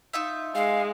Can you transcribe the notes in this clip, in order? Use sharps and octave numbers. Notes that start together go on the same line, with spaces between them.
D#4 F4 E5
G#3 F5